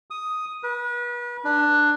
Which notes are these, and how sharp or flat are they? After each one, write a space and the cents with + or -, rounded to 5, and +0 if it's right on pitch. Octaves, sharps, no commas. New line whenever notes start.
D#6 +5
B4 -35
D4 +10